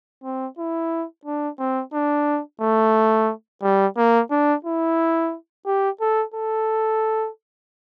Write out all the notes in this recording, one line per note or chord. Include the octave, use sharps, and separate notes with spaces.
C4
E4
D4
C4
D4
A3
G3
A#3
D4
E4
G4
A4
A4